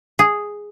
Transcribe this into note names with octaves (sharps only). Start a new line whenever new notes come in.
G#4